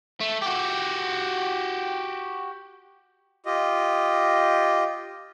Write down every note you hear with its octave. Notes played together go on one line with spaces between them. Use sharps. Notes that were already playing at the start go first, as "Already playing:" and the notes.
A3
F#4 G4
F4 G4 D#5